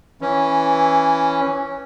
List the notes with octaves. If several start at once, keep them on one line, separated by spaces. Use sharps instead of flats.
E3 C#4